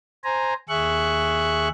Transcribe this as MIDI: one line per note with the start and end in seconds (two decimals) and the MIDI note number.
0.24 0.53 72
0.24 0.53 80
0.24 0.53 82
0.69 1.68 39
0.69 1.68 68
0.69 1.68 76
0.69 1.68 85
0.69 1.68 90